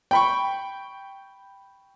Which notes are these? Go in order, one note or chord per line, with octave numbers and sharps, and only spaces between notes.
G5 B5 C#6